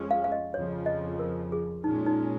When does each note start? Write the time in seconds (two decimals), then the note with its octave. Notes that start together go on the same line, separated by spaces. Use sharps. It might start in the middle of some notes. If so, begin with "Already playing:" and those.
Already playing: F2 F3 G#3 C#4
0.11 F5
0.24 F5
0.32 D#5
0.54 F2 C#3 F3 C#5
0.86 D#5
1.19 A#4
1.52 G#4
1.84 A#2 G#3 C#4 D#4
2.06 D#4